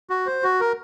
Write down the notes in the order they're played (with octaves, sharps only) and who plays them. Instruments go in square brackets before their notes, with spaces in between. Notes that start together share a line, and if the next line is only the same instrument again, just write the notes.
[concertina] F#4
C5
F#4
A#4